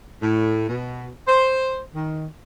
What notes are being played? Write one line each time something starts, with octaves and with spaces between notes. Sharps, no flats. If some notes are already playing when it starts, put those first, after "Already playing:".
A2
B2
C5
D#3